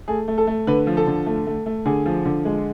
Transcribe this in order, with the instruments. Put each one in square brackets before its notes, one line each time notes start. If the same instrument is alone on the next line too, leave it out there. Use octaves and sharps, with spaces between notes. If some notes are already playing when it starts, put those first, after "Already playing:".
[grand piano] A3 G#4
A3
A4
A3
D3 B4
F3
A4
D3
A3
A3
A3
D3 G#4
F3
D3
G#3